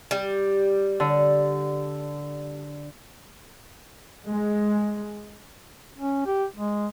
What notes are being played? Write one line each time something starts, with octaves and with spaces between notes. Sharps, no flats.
G3
D3
G#3
C#4
G4
G#3